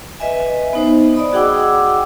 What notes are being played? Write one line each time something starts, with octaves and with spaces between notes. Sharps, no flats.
B4 D#5 E5 G#5
B3 D#4 C5
D5 D#5 B5 D#6
F#4 G#4 F#5 G5 D6 E6